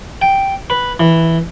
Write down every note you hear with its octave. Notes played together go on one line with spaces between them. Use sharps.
G5
B4
E3